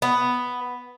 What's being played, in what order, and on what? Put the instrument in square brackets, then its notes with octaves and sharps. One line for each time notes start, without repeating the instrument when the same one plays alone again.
[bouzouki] B3